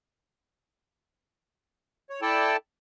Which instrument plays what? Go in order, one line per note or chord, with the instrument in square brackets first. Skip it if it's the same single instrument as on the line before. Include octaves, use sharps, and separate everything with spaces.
[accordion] C#5
E4 A4 D5 G5 A5